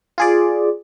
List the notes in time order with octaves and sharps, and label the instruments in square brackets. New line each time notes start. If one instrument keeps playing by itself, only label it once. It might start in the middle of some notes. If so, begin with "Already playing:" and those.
[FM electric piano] F4 G#4 D5